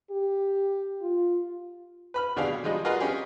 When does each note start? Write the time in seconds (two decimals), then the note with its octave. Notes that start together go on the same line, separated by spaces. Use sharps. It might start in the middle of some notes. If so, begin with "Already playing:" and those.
0.11 G4
1.01 F4
2.14 B4 B5 F6
2.36 B2 D3 D4 G4 G#4 F5
2.50 F#3
2.64 F3 G3 G#3 D#4
2.85 F4 F#4 G#4 A#4 B4 D#5
3.00 C#4 G4 G#4